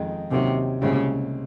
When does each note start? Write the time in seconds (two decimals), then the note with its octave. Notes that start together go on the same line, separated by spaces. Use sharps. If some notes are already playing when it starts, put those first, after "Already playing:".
Already playing: F2 D#3 G#3 D#4
0.31 D#2 C3 D#3 F#3 C#4
0.82 C2 A#2 C#3 G#3 C4